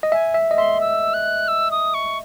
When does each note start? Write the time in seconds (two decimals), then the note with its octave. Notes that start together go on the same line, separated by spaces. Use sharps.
0.03 D#5
0.12 E5 G#5
0.34 E5
0.51 D#5
0.57 E5 C6
0.81 E6
1.14 F#6
1.48 E6
1.71 D#6
1.94 C#6